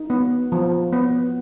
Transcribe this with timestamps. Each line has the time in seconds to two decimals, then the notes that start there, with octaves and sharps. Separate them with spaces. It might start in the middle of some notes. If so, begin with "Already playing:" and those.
Already playing: D#4
0.10 B3
0.52 F3
0.93 B3